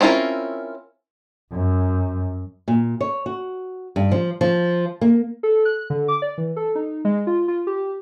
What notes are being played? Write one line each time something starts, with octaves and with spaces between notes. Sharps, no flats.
C4 C#4 E4 F4 A#4
F#2
A#2
C#5
F#4
G2
F3
F3
A#3
A4
F#6
D3
D6
D5
E3
A4
D#4
G#3
F4
F4
G4